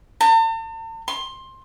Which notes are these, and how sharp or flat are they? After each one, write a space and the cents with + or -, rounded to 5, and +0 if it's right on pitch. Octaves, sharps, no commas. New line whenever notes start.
A5 +45
C6 +15